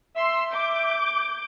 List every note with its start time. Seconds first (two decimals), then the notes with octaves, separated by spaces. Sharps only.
0.16 E5 C6 E6
0.52 D6 G6